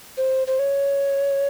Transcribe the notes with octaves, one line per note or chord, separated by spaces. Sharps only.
C5
C5
C#5